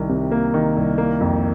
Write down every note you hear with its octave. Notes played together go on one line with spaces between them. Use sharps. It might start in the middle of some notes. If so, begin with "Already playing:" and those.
Already playing: C2 D#3
C3
A#3
D#3
C2
A#3
F2